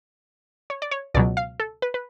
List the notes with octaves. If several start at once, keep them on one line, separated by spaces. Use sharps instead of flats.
C#5
D5
C#5
C#2 B2 F#3 D5
F5
A4
B4
B4